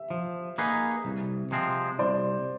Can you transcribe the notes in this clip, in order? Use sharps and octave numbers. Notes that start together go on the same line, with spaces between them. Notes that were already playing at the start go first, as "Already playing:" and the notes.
Already playing: E5
F3
A#3 D#4 G#4 B4
C2
C3 F3 G#3 C4
C2 C5 D5